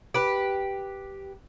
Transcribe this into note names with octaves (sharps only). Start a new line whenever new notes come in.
G4 B4